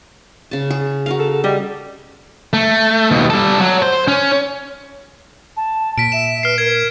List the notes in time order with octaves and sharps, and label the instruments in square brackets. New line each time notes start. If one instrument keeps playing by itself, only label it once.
[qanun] C#3 A5
G#4
F#4 A#4 F5
[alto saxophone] A4
[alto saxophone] G3 [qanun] D#5
[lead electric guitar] A3
D#2 B2
G3 A4
F#3
C5
C#4
[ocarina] A5
[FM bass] A#2 [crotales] B6 D7
[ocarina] E5 [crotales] E7
[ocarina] B4 [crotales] F6 C7
[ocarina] A#4 [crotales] G#6